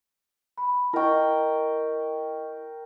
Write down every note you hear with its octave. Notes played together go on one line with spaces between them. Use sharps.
B5
E4 A#4 D#5 G5 C#6